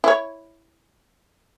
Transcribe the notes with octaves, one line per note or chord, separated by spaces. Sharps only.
E4 C#5